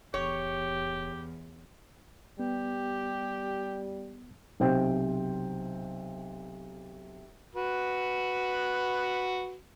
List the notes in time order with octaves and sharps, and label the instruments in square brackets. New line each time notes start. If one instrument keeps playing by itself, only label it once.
[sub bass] D1 [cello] E2 [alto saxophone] G4 [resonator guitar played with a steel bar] C#5
[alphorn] G3 [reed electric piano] B3 [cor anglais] G4
[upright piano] B1 C3 C5 G5 G6
[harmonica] F#4 B4